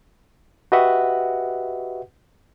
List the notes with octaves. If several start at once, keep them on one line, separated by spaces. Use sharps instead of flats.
F#4 G4 B4 D#5 E5 F#5